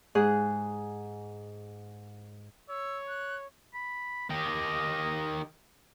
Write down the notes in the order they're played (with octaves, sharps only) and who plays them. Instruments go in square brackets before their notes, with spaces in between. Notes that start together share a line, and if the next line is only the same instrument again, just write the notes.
[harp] G#2 G#4 F#6
[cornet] C#5 [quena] E6
[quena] F#6
[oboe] B5
[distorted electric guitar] D#3 G4 [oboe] D#5